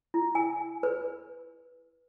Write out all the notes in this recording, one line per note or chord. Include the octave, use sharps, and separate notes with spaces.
E4
G#5
B4